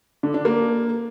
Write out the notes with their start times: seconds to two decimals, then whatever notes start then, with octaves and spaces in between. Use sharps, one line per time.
0.23 D3
0.34 D4
0.45 A#3